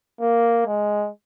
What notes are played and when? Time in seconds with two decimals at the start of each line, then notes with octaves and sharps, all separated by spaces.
0.21 A#3
0.67 G#3